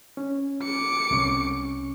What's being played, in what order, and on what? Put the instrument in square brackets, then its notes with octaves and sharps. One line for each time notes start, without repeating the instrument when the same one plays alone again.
[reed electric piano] C#4
[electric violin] D6 C#7
[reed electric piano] C2 C#4 C#6